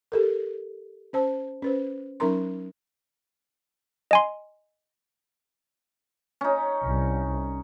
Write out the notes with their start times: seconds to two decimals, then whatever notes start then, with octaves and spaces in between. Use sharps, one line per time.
0.12 G4 A4 A#4
1.13 C#4 C5 A5
1.62 C#4 B4 C5
2.20 F#3 C#4 D#4 A#4 A#5 C6
4.11 D#5 G#5 C6
6.41 C#4 D#4
6.85 C2